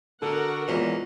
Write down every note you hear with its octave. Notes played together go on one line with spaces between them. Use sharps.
D3 F#4 A4 A#4 F#5
E2 A#2 E3 G#3 B3 C#4